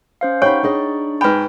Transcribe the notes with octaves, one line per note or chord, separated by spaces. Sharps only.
C#4 C5 F5
D#4 G4 C#5 F#5 G5 B5 C#6
D4 G#4 D#5
G#2 B4 G5 B5